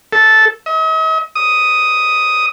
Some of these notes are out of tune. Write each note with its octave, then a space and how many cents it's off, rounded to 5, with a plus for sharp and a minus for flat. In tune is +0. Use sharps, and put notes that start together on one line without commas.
A4 -5
D#5 +45
D#6 +5